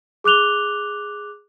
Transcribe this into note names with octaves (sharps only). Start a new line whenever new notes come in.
G#4 D6 F#6 F7 G7